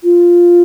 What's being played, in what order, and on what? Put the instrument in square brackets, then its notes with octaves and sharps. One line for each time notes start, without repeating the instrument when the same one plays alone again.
[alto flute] F4